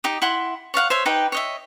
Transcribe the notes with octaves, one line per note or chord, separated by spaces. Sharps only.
D#4 G4 D#6
E4 F#5 C6
C#5 D5 F5 F#5
C5 C#5 E5
D#4 G4 B4 G5
C#5 D#5 E5